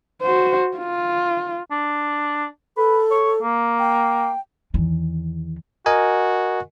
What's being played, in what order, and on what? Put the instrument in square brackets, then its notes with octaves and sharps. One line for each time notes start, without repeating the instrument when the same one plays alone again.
[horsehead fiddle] F#4 C5
F4
[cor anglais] D4
[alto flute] A4 [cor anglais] B4
[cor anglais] C#5
A#3
[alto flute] G5
[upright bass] E2 D#3
[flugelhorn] F#4 [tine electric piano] A#4 D#5 G#5